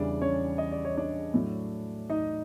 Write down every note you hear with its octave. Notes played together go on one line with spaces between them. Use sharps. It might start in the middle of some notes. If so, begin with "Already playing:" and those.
Already playing: E2 C#3 E3 G3 D4 D5
C#4 C#5
D#5
D5
C#5
D4 D5
A2 F#3 A3
D#4 D#5